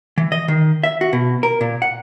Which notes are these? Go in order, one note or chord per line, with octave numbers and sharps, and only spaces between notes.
E3
D#5
D#3
E5
F#4
B2
A#4
A#2
F#5